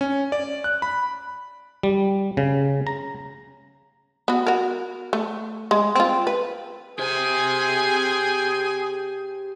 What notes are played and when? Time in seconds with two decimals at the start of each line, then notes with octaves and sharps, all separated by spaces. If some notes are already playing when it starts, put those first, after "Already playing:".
0.01 C#4
0.32 D5
0.64 F#6
0.82 B5
1.83 G3
2.37 C#3
2.87 A#5
4.28 B3 F#4
4.47 F#4 A#4
5.13 A3
5.71 G#3
5.96 C4 F4
6.27 B4
6.99 G4 G#4 C5 G5 G#5